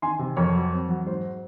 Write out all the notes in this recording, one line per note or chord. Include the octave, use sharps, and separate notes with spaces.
D#3 G#5 C6
C3
F2 A#4 C#5
F#3
C4
F#3
G#2 C5